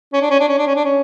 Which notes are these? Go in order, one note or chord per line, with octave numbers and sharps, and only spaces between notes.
C#4
D4
C#4
D4
C#4
D4
C#4
D4
C#4